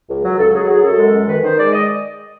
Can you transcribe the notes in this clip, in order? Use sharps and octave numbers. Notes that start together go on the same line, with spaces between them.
C#2
F#3
C#2 A4
F#3 G#4
F#3 G#4
F#2 A4
G#3
F#2
D#3 B4
D#3 C5
G#3 D5
D#5